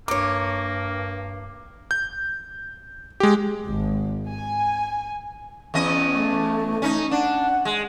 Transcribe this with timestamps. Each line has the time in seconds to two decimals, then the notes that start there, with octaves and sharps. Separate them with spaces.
0.08 G2 A#3 A#4 C#5 D6
1.91 G6
3.20 G#3 G4
3.66 G#1
4.29 G#5
5.74 E2 C#4 D#5
6.13 A3
6.82 C#4 D#4
7.11 D4 F#5
7.65 G#3